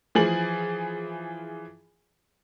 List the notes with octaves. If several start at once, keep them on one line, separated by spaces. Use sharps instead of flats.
E3 F3 G#4 F#7